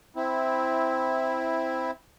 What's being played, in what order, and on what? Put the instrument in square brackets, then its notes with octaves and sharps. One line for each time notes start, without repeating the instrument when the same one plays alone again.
[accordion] C4 E4